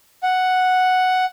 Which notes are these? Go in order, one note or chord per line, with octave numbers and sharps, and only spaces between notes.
F#5